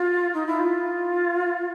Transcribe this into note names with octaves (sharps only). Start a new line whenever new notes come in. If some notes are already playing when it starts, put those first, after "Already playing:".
Already playing: F4
D#4
E4
F4